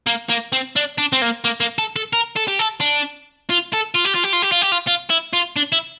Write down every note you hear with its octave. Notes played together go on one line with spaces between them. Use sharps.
A#3
A#3
C4
D4
D4
C4
A#3
A#3
A#3
A4
A4
A#4
A4
G4
A4
D4
F4
A4
F4
G4
F4
G4
F4
G4
F4
G4
F4
F4
E4
F4
D4
E4